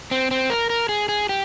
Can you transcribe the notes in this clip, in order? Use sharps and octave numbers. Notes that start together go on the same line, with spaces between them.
C4
C4
A#4
A#4
G#4
G#4
G4